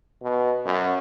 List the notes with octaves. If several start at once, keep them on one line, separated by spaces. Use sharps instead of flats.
B2
F#2